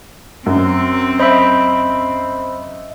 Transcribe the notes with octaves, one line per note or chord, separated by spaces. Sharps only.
F#2 C4
C5 D#5 E5 B5